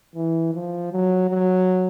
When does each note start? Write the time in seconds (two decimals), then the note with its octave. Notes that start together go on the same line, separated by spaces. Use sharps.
0.15 E3
0.54 F3
0.92 F#3
1.30 F#3